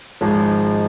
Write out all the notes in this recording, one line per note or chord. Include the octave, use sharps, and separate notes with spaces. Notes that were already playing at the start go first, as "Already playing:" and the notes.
G#1 G#2 F3 G#3